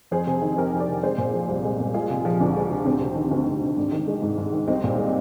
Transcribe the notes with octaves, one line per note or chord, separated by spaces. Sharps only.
F2 G#4 C5
C3
D#3
F2 G4 A#4
F2
A#4 D5
C3
G#3 G#4 C5
A#2
F3
C2
G#3
A#2
G#3 F4 G#4
C3
F3
D2 D4
G#3
C3
D2 C4
C3
D#3
D2
D2
C3
G#2 D4
D#3
G#3
G#2
G#2
D#3
C2 C4 D#4
A#2
G#3